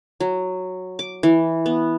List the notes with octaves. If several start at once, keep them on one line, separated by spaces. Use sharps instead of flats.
F#3
D6
E3
B3